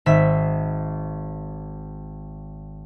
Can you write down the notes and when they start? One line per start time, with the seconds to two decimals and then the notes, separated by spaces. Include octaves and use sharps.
0.06 G#1 E5 B6